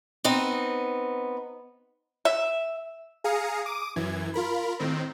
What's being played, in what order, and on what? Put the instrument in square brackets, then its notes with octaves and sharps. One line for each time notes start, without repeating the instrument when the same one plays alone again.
[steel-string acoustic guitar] B3 C4 D#4
[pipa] E5
[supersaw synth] G#4 F5 A#5 D#6 C#7
D6 D#6 D#7
F#2 E3 G#6
F4 A#4 B5
A2 D#3 C4